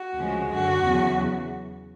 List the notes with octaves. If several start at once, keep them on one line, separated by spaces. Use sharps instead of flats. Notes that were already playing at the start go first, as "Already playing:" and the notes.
Already playing: F#4
D2 C#3 F3 G#3
F#2 D3 F#3 F#4
E2 C#3 F#3